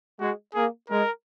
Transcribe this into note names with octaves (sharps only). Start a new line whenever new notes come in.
G#3 F#4
A#3 G#4
G#3 A#4